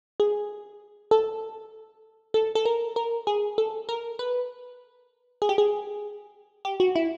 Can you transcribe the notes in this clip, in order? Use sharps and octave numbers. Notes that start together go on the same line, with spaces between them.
G#4
A4
A4
A4
A#4
A#4
G#4
A4
A#4
B4
G#4
G4
G#4
G4
F#4
E4